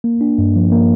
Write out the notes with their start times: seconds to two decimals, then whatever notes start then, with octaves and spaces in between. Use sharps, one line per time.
0.04 A#3
0.21 D4
0.38 G2
0.56 F3
0.72 A#3